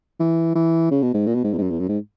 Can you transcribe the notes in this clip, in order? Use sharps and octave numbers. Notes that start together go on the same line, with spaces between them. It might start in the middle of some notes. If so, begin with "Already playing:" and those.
E3
E3
C#3
B2
G#2
A#2
B2
G#2
E2
G#2
F#2
E2
F#2
G#2